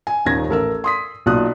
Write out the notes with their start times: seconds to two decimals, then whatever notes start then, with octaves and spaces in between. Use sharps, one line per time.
0.07 G#5
0.25 D#1 D#2 D#3 G#6 A#6
0.49 A1 A4 A#4 E6
0.84 C6 D#6 B6
1.26 B1 A#2 D#6 F#6